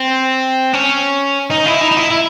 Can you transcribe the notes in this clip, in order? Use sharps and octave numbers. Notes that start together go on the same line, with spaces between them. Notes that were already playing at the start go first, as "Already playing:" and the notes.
Already playing: C4
C#4
D#4
E4
D#4
D#4
E4
E4